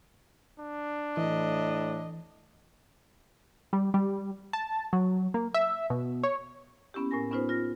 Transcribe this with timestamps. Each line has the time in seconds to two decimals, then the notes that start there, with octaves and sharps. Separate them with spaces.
0.60 D4
1.17 A2 E3 D#5
3.73 G3
3.94 G3
4.53 A5
4.93 F#3
5.34 A#3
5.54 E5
5.90 B2
6.23 C#5
6.94 A#3 B3 C#4 E4 G4
7.11 A2 A#4 G#5 A#6
7.31 B3 C#4 D#4 F4 B4 C5
7.49 F4 A#6